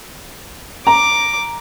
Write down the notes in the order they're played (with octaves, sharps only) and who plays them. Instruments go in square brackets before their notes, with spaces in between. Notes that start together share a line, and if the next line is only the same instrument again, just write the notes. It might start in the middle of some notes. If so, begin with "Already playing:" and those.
[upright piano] A#5 [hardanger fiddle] D6